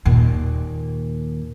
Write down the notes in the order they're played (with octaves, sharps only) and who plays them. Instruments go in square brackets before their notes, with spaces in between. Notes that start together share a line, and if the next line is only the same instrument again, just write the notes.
[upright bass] D#2 A#2